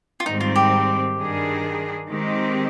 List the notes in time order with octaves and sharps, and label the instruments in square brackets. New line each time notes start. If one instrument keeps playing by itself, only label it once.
[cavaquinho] F4
[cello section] G#2 D#3 G3 C4 [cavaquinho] D#4
[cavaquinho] F4
G4
[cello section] G2 D#3 G3 D4 G#4
D#3 G#3 C4 G4